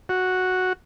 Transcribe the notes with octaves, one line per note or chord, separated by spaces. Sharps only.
F#4